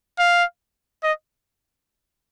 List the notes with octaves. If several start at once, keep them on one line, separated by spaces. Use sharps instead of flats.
F5
D#5